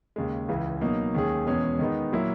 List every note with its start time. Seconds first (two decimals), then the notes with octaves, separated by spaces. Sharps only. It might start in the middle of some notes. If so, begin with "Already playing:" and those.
0.16 D#2 C#3 G#3
0.48 C#2 C#3 E3
0.81 B2 F#3 A#3 D#4
1.14 D#2 D#3 G#3 C#4 G#4
1.47 E2 B2 G#3 C#4 G#4
1.79 D#3 G#3 B3 D#4
2.12 A#2 F#3 A#3 E4